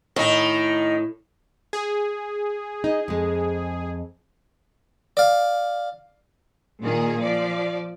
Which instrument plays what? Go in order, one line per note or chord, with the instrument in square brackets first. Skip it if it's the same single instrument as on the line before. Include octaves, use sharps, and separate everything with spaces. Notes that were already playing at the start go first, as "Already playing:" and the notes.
[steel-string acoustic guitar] A2 [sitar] D#3 D#4
[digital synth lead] G#4
[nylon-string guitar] D#4
F2 G#3
[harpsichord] D5 F5
[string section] A#2 D#3 G#4
F3 D5